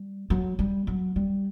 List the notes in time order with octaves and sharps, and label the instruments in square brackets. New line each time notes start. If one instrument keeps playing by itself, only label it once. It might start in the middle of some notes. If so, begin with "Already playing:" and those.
Already playing: [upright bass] G3
F#3
G3
F#3
G3